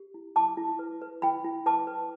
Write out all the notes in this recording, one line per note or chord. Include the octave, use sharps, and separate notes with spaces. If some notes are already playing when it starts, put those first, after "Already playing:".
Already playing: G4
E4
E4 A5 D6
E4
B4
B4
E4 G5 B5
E4
B4 A5 D6
B4